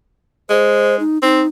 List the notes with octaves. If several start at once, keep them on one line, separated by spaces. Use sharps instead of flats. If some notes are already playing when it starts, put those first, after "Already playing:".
G#3 C5
D#4
C4 D#4